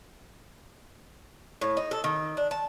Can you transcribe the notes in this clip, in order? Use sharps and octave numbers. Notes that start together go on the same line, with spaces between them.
A2
D#4
A4
D#3
D4
A5